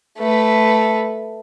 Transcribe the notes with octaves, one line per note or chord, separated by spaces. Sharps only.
A3 B4